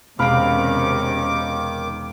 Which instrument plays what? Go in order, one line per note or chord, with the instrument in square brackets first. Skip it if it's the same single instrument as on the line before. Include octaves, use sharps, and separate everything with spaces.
[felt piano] E1 D7 [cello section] C3 C#4 [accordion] D#3 D6 [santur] F5 B5